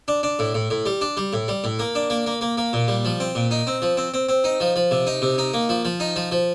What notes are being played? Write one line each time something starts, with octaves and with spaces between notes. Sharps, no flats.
D4
D4
A2
A2
A2
G3
D4
G3
A2
G3
A2
A#3
D4
A#3
A#3
A#3
A#3
A#2
G3
F3
C4
A#2
D#4
C4
F3
C4
C4
C4
D#4
F3
F3
C3
D#4
C3
D#4
A#3
F3
F3
D#4
F3
F3